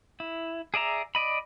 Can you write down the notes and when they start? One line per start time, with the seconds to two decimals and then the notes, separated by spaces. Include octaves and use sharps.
0.20 E4
0.74 G#4 D5 E5 A#5
1.15 D5 D#5 B5